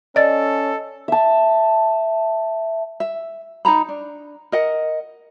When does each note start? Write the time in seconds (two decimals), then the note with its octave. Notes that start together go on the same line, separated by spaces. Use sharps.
0.16 C#4 A4 D5 D#5 A6
1.08 E5 A5
3.00 E5
3.65 D#4 C#5 A#5 B5
3.89 D4
4.52 A#4 D#5 F#5